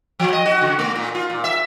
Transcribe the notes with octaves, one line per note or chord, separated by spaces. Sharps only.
F3
D#5
F#4
C#3
A3
A#2
F4
A#2
E5